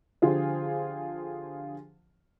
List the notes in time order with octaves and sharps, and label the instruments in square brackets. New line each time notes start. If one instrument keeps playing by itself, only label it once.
[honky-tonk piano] D3 F3 F4 G4 G#4 C5